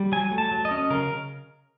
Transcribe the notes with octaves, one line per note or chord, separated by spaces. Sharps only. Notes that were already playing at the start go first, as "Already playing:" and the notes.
Already playing: G3
F#3 G#5
A3
A5
F#3
D#5
C#4
C#3 A#4